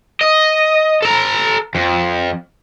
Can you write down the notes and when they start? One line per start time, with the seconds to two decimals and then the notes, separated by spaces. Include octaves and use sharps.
0.21 D#5
1.02 A4 A#5
1.75 F2